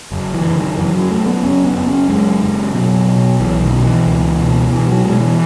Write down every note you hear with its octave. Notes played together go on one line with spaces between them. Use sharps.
F#1
E3
F#1
D#3
F#2 E3
F#3
F#2 A3
B3
F#1 C#4
B3
F#1
C#4
F#2 G#3
F#1
B2 F#3
B2
B1 E3
D#3
B2
E3
C#2
B2
B2 E3
F#3
B2 G#3
E3